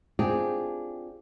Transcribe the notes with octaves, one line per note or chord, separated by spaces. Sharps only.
C4 D4 F4 G4 G#4